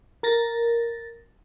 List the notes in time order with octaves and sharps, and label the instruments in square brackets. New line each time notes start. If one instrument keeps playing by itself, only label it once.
[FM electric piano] A#4 A6 A#6